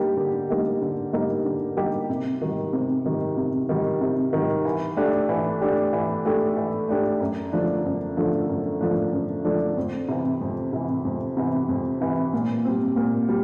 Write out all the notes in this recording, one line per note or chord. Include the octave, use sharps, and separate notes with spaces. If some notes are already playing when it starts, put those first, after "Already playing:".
Already playing: D3 G3 A#3 D#4 G4
D3
G3 A#3 D#4 G4
D3
G3 A#3 D#4 G4
D3
G3 A#3 D#4 G4
C3
D#3 G3
C3
D#3 G3
C3
D#3 G3
C3
D#3 G3
E3
A3 D4 G4
E3
A3 D4 G4
E3
A3 D4 G4
E3
A3 D4 G4
F#2
D3 F3 A3 D4
F#2
D3 F3 A3 D4
F#2
D3 F3 A3 D4
F#2
D3 F3 A3 D4
F2
C3 E3
F2
C3 E3
F2
C3 E3
F2
C3 E3
A#2
G3 C4
A#2
G3